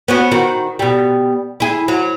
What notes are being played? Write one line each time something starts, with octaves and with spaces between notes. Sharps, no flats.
B3 C#4 F#4
D#3 F#4
B2 G3
E4 G#4
F#3